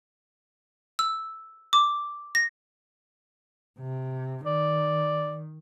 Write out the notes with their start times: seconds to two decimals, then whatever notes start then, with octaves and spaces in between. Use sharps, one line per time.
0.99 E6
1.73 D6
2.35 A#6
3.79 C3
4.46 D#3 D5